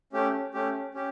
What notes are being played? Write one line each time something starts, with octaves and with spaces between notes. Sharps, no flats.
A3 C#4 G4
A3 C#4 G4
C#4 G4